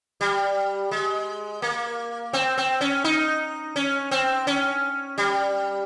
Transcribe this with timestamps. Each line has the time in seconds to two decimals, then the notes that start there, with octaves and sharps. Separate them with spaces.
0.21 G3
0.91 G#3
1.62 A#3
2.33 C4
2.58 C4
2.81 C#4
3.04 D#4
3.76 C#4
4.11 C4
4.47 C#4
5.18 G3